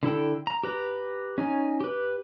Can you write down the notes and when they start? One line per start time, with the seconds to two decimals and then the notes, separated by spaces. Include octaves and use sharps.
0.03 D3 E4 A4 G5
0.47 A#5
0.63 G4 B4 A#5
1.38 C#4 D#4 G#5
1.81 G4 B4